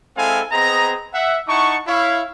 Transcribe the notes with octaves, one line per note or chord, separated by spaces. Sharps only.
G#3 C4 E4 A4 F5 G#5
B3 C4 G#4 D#5 A#5
E5 F#5
D#4 E4 F#5 A5 C#6
E4 C#5 F5